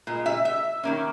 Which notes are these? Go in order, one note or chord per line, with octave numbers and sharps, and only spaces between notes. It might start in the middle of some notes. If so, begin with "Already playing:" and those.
A#2 G#3
E5
E5
D#3 A#3 C#4